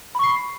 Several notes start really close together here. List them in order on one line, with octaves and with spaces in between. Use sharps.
B5 C#6 C7